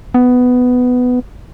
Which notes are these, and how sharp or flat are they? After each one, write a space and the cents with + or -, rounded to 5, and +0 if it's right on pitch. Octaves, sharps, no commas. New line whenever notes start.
B3 +10